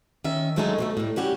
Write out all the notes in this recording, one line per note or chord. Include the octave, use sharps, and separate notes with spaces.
D#3 C#4 E5
D3 F#3 G#3 A3 C#4 D#4
B2 F3 A3
A2 G3
G3 C#4 F#4 G4